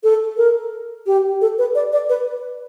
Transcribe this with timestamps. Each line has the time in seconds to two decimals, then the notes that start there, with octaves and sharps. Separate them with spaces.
0.04 A4
0.37 A#4
1.07 G4
1.41 A4
1.58 B4
1.75 D5
1.93 D5
2.09 B4